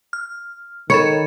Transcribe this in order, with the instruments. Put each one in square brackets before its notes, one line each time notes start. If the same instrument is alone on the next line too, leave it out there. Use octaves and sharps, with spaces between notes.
[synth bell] F6
[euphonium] D#3 [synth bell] A4 B5 C#7 [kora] C#5